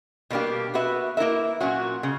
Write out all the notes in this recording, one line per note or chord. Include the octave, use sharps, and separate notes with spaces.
B2 G3 A#3 D4 G4
B3 F#4 B4 E5
A#3 E4 A#4 E5
A#2 F#3 C#4 F#4
C#3